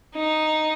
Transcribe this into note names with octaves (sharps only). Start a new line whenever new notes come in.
D#4